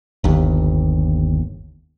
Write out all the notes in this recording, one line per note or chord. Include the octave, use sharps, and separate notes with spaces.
G1 D#2